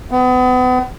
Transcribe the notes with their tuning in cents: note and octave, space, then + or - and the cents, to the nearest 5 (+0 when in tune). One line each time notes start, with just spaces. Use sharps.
B3 +35